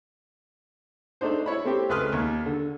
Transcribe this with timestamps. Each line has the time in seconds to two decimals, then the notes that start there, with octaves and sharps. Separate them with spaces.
1.21 A3 D4 D#4 C5
1.46 E4 C#5 B5
1.64 A3 C4 G4
1.89 C#2 A3 B4 C6 D#6 F6
2.13 D#2
2.46 D3